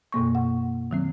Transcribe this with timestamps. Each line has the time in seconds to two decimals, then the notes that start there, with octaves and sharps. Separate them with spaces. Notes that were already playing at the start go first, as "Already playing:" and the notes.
0.12 F#2 B2 A#3 C#6
0.35 F#5
0.91 D#3 F#3 C4